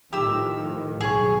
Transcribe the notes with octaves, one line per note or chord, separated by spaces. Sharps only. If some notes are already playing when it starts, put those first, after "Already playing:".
A2 D#3 F3 G4 E6
B1 G2 G#4 C#5